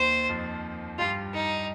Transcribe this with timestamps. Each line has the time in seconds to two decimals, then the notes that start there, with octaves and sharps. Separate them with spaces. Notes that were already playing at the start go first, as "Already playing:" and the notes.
Already playing: D#2 D#3 C5
0.29 F2 F3
0.99 G2 G3 F4
1.33 D#4